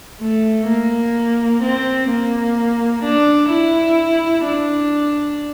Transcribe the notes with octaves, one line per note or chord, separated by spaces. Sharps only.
A3
A#3
C4
A#3
D4
E4
D4